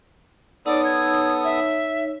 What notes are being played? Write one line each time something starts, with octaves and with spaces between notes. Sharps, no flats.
B3 D#4 A4 C#5 D5 D#6
G#6
E5